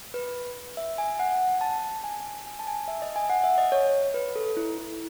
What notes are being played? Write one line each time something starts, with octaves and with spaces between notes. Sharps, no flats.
B4
E5
G#5
F#5
A5
G#5
G#5
A5
G#5
E5
D#5
G#5
F#5
E5
D#5
C#5
B4
A4
E4
E4